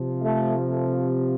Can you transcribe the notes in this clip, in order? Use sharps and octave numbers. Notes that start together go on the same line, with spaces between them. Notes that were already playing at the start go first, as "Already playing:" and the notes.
Already playing: C3 F3
A3
A3